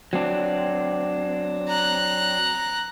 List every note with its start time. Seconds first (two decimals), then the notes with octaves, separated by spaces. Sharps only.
0.13 F#3 C4 D4
1.68 A#5 F#6